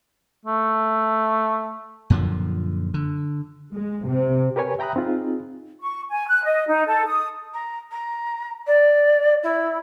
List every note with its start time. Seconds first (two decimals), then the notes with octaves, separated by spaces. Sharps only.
0.45 A3
2.10 F#2 A#2 D3 F3
2.94 D3
3.74 G#3
4.06 C3
4.56 G4 A#4 B4 C#5 G#5
4.79 E5 G5 A#5 B5 D#6 F#6
4.96 C4 D#4 F4 G#4
5.81 C#6
6.10 G#5
6.27 F#6
6.44 D#5
6.67 D#4
6.86 A4
7.06 D#6
7.53 A#5
7.91 A#5
8.66 D5
9.43 E4